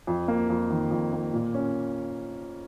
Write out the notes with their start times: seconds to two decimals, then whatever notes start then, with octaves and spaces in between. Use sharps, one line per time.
0.07 F2
0.28 A#3
0.50 F2
0.70 D#3
0.91 F2
1.13 A#3
1.33 A#2
1.54 C#4